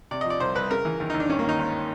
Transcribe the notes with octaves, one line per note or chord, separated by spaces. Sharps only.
C3 D5
D#5
F3 D5
C2 C5
C2 B4
C#3 A#4
E3
D#2
D#4
D#2
D4
G2 C#4
A#3
D#3 D#4
G#1